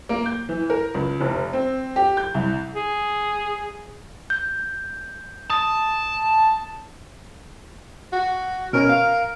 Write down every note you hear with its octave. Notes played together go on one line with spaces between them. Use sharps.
A#3
G6
E3
A#4
C#2
F1
C4
G4
G6
C2
G#4
G6
A5 D#6
F#4
B2 C#4 A#4
F5